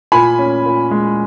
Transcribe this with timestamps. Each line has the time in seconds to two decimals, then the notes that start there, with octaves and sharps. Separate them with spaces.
0.12 A#2 G#5 B5
0.39 C#4
0.65 A#2
0.91 G#3